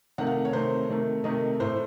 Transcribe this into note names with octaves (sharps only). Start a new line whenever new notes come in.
C3 D#3 A3 F#5
F5
C#5
C3 D#3 A3 C5
C3 D#3 A3
C3 D#3 A3 D#5
A2 A3 C5